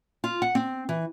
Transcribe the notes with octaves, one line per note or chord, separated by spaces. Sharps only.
F4
F#5
C4
E3